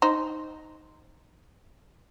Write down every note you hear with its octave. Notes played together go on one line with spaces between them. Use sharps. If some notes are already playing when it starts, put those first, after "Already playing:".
D#4 C5